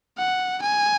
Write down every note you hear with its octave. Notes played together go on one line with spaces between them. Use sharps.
F#5
G#5